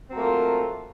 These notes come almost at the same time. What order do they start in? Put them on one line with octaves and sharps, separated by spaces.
C4 F#3 A3 A#3 F4